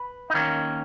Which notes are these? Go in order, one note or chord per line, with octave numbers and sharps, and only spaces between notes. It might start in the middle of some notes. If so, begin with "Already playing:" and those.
Already playing: B4
D#4
D#2 D#3 A#3 C#4